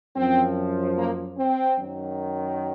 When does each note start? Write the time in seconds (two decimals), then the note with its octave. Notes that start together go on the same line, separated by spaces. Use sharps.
0.15 F#2 F3 C4
0.96 A#3
1.37 C4
1.77 F#2 D#3 F#3